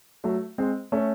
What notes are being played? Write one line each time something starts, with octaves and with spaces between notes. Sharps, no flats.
F#3 A3
G#3 C4
A3 C#4